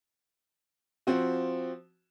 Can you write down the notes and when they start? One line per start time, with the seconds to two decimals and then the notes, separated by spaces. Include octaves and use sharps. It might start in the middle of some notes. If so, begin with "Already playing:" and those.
1.07 F3 C4 F#4